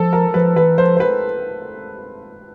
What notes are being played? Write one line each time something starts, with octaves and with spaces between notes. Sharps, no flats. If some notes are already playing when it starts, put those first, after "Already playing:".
Already playing: F3 A4
A#4
F3 B4
E3 B4
F3 C5
C5
B4